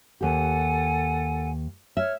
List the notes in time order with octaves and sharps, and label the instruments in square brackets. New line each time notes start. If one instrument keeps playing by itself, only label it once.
[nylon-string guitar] D#2 G4 [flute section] A4 F#5 G#5
[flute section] C#5 F6 [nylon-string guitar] E5